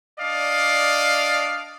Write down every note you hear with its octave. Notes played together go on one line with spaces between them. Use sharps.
D4 D5 D#5 F5